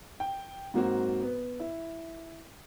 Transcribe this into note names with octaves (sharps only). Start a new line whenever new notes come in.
G5
G#2 F#3 A#3 C4 F#4
B3
E4